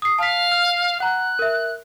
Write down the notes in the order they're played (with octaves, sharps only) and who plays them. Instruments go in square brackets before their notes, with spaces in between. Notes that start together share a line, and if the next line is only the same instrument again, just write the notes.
[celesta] D#6 C7
[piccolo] F5 [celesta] A5 B6
[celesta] F6
[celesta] F#5 A#5 [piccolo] F#6
[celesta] A#4 E5